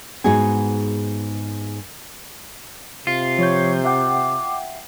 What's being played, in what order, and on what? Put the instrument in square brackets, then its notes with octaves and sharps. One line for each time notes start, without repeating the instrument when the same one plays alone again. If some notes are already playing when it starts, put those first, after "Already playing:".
[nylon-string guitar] G#2 B3 D#4 F#4 G#4 G#5
[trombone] C3 [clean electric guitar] F4
[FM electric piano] F3 G6 [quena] C#5
[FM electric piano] E5 F#5 G5 [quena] D6